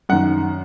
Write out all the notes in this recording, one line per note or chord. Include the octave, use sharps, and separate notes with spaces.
F#2 D#3 F#5